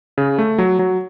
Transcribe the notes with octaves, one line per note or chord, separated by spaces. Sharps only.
C#3
A3
F#3
F#3